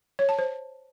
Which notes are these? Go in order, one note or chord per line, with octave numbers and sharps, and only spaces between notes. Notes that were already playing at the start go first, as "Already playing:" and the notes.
C#5
A5
C5